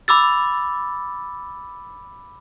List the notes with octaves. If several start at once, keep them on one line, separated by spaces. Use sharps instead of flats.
B5 D6 E6 A6